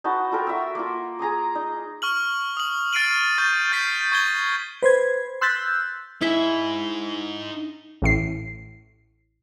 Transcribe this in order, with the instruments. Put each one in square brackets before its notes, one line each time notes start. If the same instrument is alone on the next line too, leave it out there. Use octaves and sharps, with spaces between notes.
[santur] D#4 F#4 B4 A5
F4 A4 A#4 G5
F#4 E5 E6
A#3 F4
G#4 A#5 C6 D#6
D#4
[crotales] C#6 F6 F#7
D#6 F#7
F6 A6 C7 D7 D#7 F#7
C#6 G6 A6
F6 G6 A6 B6 C7
C#6 G#6 G7
[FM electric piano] B4 C5 G#6
C6 E6 F#6 G6 A6 B6
[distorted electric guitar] D#4 G#5 [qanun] E4 E5
[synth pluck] A1 A2 C7